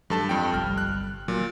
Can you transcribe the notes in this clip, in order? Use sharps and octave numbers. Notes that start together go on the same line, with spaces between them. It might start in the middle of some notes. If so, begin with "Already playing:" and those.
G2 F#3 G#3 A4 A5
F2 G5
G1 C2 G3 F6
F#6
A#2 F#3